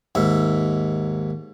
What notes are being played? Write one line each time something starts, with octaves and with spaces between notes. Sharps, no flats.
D#2 G#2 E5